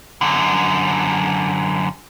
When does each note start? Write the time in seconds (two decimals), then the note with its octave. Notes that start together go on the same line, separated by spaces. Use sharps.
0.21 F#2 D3